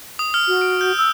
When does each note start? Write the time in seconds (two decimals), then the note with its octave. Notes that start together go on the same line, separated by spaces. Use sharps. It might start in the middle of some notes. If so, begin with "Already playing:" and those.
0.19 D#6
0.34 F6
0.48 F#4
0.61 D7
0.81 G6
0.98 E6